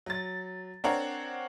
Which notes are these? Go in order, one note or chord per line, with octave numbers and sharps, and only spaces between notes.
F#3 A6
C4 D4 A#4 C#5 F#5